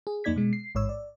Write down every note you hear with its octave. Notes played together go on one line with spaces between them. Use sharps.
G#4
F2 A#3 D#4 D5 G#6 B6
B2 G#3
C7
A1 G#2 C#5 E6
D5